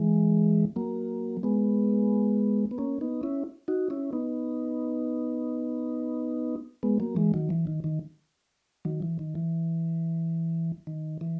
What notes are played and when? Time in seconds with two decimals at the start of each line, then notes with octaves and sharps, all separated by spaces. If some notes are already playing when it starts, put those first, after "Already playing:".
Already playing: E3 G#3
0.76 F#3 A#3
1.43 G#3 B3
2.71 B3
2.78 A#3 C#4
3.01 B3 D#4
3.23 C#4 E4
3.68 D#4 F#4
3.90 C#4 E4
4.13 B3 D#4
6.83 G#3 B3
7.00 F#3 A#3
7.16 E3 G#3
7.34 D#3 F#3
7.50 E3
7.67 D#3
7.84 D#3
8.85 D#3 F#3
9.02 E3
9.19 D#3
9.35 E3
10.87 D#3
11.21 E3